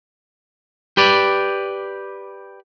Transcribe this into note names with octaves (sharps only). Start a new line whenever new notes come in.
G4 B4 D5